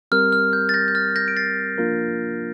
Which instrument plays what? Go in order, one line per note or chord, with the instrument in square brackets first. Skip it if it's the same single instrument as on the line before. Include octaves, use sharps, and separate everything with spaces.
[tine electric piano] G3 C4 G4 A#4 [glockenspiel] F6
[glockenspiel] F6
G6
A6
G6 A#6
G6
F6 A6
A6
G6 A#6
D7
A6 C7
[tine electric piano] F3 A#3 D4 F4 A#4